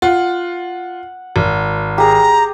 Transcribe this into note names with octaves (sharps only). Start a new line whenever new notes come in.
F4 F#5
G#1
G4 G#4 A#5